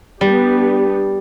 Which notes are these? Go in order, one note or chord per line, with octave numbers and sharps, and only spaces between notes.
G3 B3 D4 G4